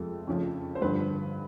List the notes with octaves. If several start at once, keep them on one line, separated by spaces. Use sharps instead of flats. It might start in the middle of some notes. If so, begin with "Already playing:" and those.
Already playing: F2 C3 F3 G#3 A4
F2 C#3 F3
C5
G2 D3 F3 B4